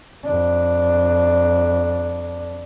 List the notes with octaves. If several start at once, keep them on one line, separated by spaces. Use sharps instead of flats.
F2 D4